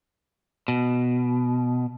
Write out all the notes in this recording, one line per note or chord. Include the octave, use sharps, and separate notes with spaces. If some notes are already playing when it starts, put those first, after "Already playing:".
B2